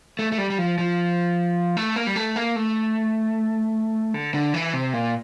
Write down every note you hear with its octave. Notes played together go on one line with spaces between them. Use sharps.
A3
A3
G3
G3
F3
F3
A3
A#3
G3
A3
A#3
A3
D3
D3
E3
C3
A#2